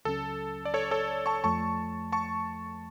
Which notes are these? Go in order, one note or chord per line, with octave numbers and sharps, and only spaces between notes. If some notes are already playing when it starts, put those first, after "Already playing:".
C#2 C#3 F#3 C#4 A4
D5
A4 C#5
A4 C#5
A5 C#6
F2 F3 A3 A5 C#6
A5 C#6